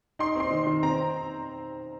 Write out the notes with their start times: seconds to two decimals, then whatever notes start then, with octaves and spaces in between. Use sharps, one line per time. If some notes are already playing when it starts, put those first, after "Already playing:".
0.19 D#4 C6
0.36 C4 C6
0.50 D#3
0.67 D#3
0.83 C4 A#5